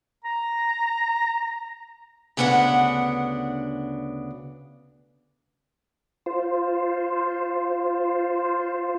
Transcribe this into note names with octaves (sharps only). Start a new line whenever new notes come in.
A#5
D2 C#3 B3 D4 F#4 F#5
F4 C5